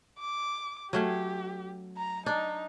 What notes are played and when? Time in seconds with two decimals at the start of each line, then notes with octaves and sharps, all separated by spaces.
0.20 D6
0.93 F#3 A3 C#4 G4
1.97 A#5
2.26 D4 D#4